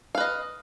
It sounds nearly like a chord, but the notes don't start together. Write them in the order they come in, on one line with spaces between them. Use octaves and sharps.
F5 B4 D#5